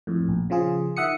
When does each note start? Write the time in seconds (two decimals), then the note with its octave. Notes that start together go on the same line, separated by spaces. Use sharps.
0.07 F2 A2
0.28 A#1
0.50 C#3 F3 F4 G#4
0.97 D#3 E5 F#5 D#6 C#7